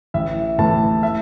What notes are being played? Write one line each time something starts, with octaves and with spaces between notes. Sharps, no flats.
A1 E5
A2 E3 A3 A5
E5